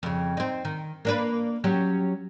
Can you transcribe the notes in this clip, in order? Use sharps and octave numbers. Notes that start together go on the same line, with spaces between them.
F2 C#3
C4 D#4
D#3
A#3 D4 B4
F#3 C#4 G4